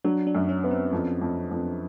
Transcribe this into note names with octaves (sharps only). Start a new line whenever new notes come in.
F#3 D4
D4
F#2
C#4
B3
C4
F2
F2
F2